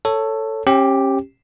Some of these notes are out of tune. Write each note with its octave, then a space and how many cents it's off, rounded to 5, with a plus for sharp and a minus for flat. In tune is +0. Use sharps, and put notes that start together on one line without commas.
A4 +10 C#5 +0
C#4 -35 G4 +0